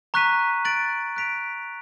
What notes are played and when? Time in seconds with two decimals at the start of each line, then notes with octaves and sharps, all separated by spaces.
0.14 A#5 C#6 F#6 B6 D#7
0.65 F#6 A6 D7 F#7
1.16 F#6 B6 D7 F7